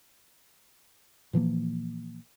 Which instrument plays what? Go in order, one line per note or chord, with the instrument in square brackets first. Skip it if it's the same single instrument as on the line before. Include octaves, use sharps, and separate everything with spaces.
[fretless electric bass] A#2 E3 F3 A#3